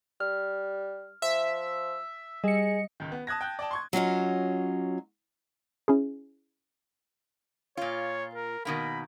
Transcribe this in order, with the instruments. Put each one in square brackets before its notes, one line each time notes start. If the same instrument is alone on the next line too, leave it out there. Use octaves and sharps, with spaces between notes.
[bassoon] G3 [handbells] F6
[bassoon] F3 [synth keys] E5
[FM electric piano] G3 C#7 [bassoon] G#4 [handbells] D#5
[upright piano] C#2 D#3
B3
A5 D#6 F#6 G#6 A#6
G5 A5 F#6 G6
D5 G5 A5
C6 C#6 G#6
[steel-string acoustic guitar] F#3 C#4 F4 D#5
[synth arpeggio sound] C#4 E4 G#4
[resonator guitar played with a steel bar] A#2 F4 [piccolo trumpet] C#5
[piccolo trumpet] A#4
[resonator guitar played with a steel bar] B2 D#3 A#3 [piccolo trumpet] B5